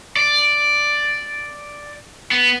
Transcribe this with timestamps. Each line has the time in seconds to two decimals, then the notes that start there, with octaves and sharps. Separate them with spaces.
0.16 D5
2.31 B3